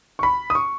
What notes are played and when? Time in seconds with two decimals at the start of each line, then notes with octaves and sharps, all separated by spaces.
0.19 C#6
0.23 B5
0.50 D#6
0.55 C#6